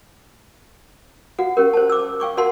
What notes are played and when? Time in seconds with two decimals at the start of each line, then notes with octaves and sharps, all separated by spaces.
1.39 F#4 F5 F#5
1.57 C#4 G4 A#4
1.73 C5 A5
1.90 D6 E6
2.20 F5 G5 C#6 D6
2.37 F#4 A#4 F5 F#5 A5 C6